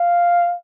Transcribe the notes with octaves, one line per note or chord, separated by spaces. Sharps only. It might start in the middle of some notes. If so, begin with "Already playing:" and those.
Already playing: F5